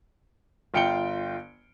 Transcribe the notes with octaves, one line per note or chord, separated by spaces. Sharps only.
G1 F4 G5 C#7 D7 G7